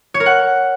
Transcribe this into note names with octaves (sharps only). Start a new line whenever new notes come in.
C#5
A#4
F#5